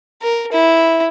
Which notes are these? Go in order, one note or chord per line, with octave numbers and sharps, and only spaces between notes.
A#4
E4